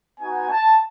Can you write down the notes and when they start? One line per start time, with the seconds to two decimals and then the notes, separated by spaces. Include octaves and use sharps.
0.19 B3 D#4 F#4 G#5
0.49 A5